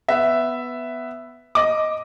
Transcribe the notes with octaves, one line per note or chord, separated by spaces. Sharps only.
B3 E5
D#5 D6